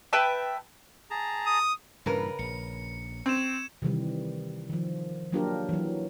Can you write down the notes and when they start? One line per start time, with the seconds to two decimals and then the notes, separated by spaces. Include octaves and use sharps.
0.13 B4 E5 G5 A5
1.11 G#4 A5 A#5
1.46 D#6
2.06 G2 A#2 C#3 E3 A#4 B4
2.39 A#1 C#7
3.26 C4 C#6 G#6 E7
3.82 C3 D#3 E3 G3
4.70 D#3 F3
5.33 F#3 A#3 D4 F4 G4 A#4
5.69 E3 F#3